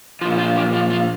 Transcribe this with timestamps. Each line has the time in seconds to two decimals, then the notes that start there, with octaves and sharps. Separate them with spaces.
0.21 F3 F4
0.25 A#2
0.39 F4
0.56 G4
0.73 F4
0.90 F4